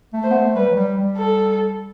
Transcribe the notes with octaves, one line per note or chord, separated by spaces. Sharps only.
A3
C5
B3
A3
G3 B4
F#3
G3
G3
A4